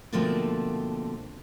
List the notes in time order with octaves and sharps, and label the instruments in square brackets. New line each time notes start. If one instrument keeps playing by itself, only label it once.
[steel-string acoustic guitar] B2 D3 F3 A3 A#3 C4